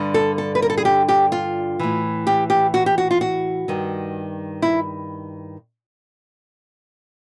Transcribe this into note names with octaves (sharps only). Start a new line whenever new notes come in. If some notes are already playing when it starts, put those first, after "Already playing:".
Already playing: G2 D3
A4
A4
B4
A#4
A4
G#4
G4
G4
F4
A2 E3
G4
G4
F#4
G4
F#4
F4
F#4
G2 D#3
E4